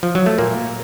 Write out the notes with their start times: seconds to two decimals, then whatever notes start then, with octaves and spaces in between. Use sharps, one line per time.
0.03 F3
0.15 F#3
0.26 A3
0.38 A#2 A#3
0.58 A#2